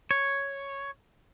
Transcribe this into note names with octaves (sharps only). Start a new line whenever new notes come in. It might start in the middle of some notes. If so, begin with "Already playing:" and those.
C#5